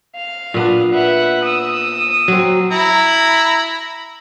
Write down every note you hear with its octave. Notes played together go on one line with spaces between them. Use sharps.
F5
A#2 B3 D4
B4 E5 F#5
D#6 E6
F#3 C4
E4 A#5 B5